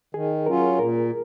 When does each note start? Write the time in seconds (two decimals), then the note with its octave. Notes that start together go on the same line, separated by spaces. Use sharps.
0.14 D#3 G#4
0.46 F#3 C#4 F4 A#4
0.79 A#2 A#4